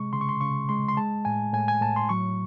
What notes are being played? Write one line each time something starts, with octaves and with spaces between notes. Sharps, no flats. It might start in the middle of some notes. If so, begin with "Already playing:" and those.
Already playing: C3 G#3 C#6
C#3 C6
C#6
C6
C#3 C#6
G#3 C6
C6
G#3 A5
A2 G#5
A2 G#5
G#5
A2 A5
C6
F#3 C#6